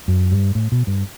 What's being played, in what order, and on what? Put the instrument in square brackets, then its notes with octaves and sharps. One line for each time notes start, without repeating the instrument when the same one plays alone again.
[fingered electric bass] F#2
G2
A2
B2
G2